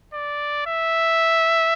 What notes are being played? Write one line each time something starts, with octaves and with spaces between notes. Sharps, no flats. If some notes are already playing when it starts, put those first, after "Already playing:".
D5
E5